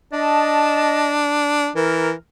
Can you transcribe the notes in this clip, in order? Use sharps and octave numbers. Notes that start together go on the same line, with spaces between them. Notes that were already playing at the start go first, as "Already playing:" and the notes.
D4 D#5 A5
E3 A#4